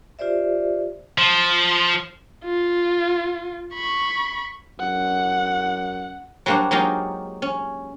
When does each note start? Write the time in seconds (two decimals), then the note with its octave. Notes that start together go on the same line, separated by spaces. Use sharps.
0.19 F4 G4 C5 D5 E5
1.18 F3
2.44 F4
3.74 B5 C#6
4.79 F#2 F#5
6.46 F#3 G3 A#3 D4 C5 F#5
6.71 F#3 G#3 A#3 D#4 F4 G4
7.42 C#4